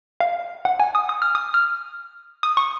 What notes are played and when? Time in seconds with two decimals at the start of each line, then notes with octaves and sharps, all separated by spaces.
0.20 F5
0.65 F#5
0.80 G#5
0.95 D#6
1.09 D#6
1.22 F6
1.35 D#6
1.54 F6
2.43 D#6
2.57 C#6